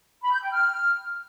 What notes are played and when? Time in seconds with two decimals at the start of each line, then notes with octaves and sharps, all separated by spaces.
0.21 B5
0.32 G6
0.42 G5
0.52 F6